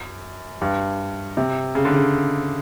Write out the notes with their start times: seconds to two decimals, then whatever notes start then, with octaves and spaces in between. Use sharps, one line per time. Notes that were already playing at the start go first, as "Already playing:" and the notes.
Already playing: F#2
0.61 G2
1.37 C3
1.75 C#3
1.85 D3
1.94 C#3